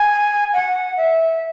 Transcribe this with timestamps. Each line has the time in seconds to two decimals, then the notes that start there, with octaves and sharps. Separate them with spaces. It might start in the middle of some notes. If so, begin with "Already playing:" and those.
Already playing: G#5
0.53 F#5
0.97 E5